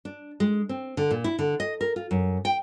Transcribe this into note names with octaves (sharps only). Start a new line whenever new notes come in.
D4
G#3
C4
D3
A#2
E4
D3
D#5
A#4
F4
F#2
G5